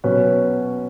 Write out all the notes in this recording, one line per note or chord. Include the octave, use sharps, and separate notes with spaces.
B2 F#3 C#4 B4